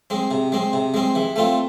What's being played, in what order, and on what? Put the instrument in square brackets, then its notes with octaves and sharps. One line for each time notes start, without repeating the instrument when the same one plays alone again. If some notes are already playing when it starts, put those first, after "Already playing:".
[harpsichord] G#3 C4
C3
G#3 C4
C3
G#3 C4
E3
A3 C4 F4